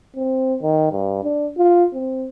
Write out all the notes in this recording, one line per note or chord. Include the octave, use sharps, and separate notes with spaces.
C4
D#3
G2
D4
F4
C4